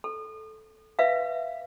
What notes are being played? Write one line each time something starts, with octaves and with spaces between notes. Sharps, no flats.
A4
B4 E5 F5